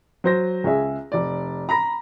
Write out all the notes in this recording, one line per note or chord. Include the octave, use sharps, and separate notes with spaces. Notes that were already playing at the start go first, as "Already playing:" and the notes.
F#3 C5 A#6
C#2 C#4 G#4 E5
F1 D5
A#5 B5 A#6